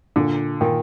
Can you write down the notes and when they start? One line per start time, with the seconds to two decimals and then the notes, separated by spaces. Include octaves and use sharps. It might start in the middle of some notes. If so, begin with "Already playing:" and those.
0.16 A#2 D3
0.61 A#2 D#3